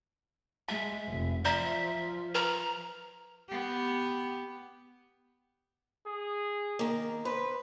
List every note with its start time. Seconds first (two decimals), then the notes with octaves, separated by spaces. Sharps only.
0.68 G#3 E5 A5
1.08 F1
1.45 F3 D5 E5 A#5
2.35 B4 A#5
3.49 B3 G4
6.06 G#4
6.79 D#3 A#3
7.25 B4 C5